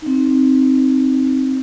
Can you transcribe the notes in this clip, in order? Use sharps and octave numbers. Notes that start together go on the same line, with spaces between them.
C4 D#4